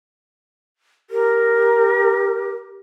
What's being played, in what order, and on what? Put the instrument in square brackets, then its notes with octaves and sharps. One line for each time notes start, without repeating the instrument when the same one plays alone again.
[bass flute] G4 [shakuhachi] A#4